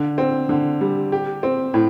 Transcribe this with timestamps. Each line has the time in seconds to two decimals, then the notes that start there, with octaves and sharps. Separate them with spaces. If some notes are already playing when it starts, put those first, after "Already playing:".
Already playing: D3
0.18 C4
0.49 D3
0.81 G3
1.12 G4
1.43 C4
1.74 A2